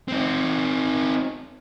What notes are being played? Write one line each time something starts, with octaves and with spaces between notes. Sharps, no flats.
C4 D#4